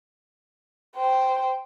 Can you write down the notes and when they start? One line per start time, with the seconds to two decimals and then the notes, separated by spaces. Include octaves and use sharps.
0.96 C5 G5